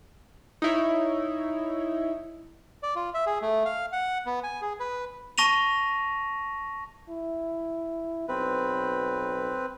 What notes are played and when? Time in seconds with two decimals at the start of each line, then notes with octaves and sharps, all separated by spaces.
0.62 D#4 E4 C#5
2.83 D5
2.96 F4
3.14 E5
3.26 G#4
3.42 A3
3.65 F5
3.92 F#5
4.26 B3
4.43 G#5
4.61 G#4
4.80 B4
5.38 A5 C#6 A#6 D#7 F7
7.09 E4
8.28 B1 C4 B4